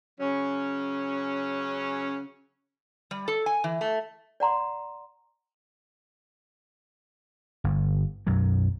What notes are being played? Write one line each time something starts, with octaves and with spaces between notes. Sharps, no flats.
C#3 F#3 C#4
G3
A4
G#5
E3
A3
D5 F#5 A#5 C6
G1
B1 F#2 F#3